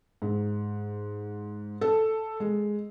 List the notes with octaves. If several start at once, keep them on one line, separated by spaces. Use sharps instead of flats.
G#2
A4
G#3